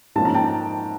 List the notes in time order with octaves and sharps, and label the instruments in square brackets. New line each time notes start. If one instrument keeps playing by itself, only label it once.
[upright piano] G#2 F3 A#3 C#4 A5
A#5
G5 A5